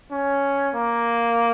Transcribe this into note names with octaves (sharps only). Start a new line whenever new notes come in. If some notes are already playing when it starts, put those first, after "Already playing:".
C#4
A#3